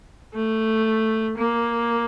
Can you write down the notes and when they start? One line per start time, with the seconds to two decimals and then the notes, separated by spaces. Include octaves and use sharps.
0.34 A3
1.37 A#3